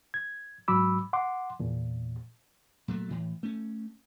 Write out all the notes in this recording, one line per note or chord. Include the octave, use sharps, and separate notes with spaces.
G#6
G#2 F#3 B5 D6 E6
F#5 C6 D6
E2 A#2
A#2 F#3 A3
A2 E3
A3 C#4